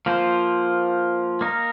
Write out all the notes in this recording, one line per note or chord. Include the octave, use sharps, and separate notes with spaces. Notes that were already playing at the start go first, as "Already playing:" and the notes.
F3 A#3 F4 C5
A#3 D#4 A#4